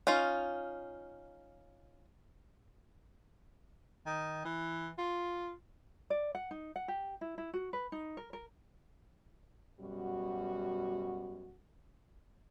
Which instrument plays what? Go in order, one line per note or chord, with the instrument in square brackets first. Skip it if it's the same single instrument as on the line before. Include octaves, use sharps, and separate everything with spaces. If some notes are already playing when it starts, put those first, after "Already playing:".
[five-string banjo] C#4 D#4 F4
[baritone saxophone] D#3
E3
F4
[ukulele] D5
F#5
D#4
F#5
G4
E4
E4
F#4
B4
D#4
A#4
A#4
[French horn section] F#2 B2 G3 F#4